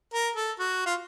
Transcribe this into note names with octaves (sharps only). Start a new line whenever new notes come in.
A#4
A4
F#4
F4